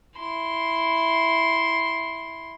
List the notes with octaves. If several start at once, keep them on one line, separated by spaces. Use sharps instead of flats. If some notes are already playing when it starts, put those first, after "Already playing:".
E4 C6